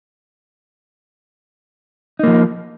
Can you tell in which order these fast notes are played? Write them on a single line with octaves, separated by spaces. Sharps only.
D#4 A#3 F3